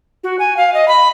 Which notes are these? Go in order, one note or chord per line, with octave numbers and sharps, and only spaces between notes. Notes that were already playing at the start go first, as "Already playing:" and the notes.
F#4
G#5
F5
D#5
B5